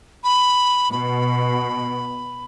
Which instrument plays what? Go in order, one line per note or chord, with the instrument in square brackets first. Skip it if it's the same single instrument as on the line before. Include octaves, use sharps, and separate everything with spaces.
[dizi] B5
[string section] B2 [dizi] B5